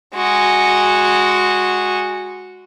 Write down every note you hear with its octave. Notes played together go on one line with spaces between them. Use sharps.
G#3 F#4